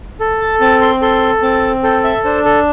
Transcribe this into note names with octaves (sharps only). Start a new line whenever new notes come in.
A4
A5
C4 A5
C6
A4 C6
C4 A5
A4 G5
E5
D4 C5
A4